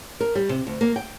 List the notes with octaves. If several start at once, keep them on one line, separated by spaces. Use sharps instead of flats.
A#4
G3
C3
D2
A#3
G5